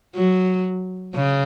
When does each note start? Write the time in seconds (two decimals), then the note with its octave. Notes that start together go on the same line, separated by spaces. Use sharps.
0.16 F#3
1.15 C#3